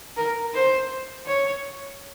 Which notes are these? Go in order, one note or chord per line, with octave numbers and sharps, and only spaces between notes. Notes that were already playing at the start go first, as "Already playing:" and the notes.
A#4
C5
C#5